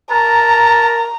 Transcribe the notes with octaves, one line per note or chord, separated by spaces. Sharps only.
A#4 A5 A#5